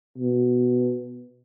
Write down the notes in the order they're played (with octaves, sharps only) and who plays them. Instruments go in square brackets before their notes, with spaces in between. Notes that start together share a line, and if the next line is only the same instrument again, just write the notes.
[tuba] B2